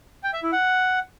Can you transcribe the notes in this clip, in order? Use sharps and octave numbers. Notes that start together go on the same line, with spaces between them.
G5
E5
E4
F#5